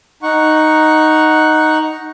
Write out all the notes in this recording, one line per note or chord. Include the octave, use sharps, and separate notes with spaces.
D#4 F#5 C#6